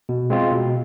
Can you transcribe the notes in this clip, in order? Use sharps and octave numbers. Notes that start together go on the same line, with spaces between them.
B2
G#3 C4 F4
B2